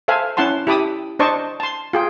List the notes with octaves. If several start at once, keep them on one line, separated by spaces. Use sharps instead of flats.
A4 C5 E5 F5 G#5
C#4 E4 F#5 A5 C6
E4 G4 A5 B5 D6 D#6
D4 C5 D#5 A5 C#6 D6
A5 C6
F4 G#4 G5